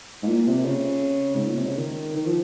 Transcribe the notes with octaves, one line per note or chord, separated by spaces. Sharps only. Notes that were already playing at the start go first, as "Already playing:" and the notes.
G#2
A#2
C3
C#3
G#2
A#2
C3
C#3
D#3
D#3
F3